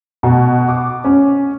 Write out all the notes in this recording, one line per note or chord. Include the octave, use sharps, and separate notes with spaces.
B2
D6
C#4